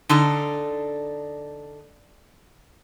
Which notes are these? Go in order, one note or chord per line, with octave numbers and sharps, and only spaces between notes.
D3 D4 D#4 A4